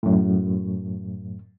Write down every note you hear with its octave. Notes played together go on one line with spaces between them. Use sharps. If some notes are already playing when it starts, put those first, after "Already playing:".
F#2 A2